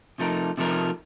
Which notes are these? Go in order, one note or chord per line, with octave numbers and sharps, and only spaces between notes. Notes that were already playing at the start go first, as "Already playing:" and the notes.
C3 F3 A3 D#4 A#4
C3 F3 A3 D#4 A#4